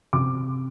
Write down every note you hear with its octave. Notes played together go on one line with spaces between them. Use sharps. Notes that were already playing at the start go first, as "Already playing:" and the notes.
C3 D6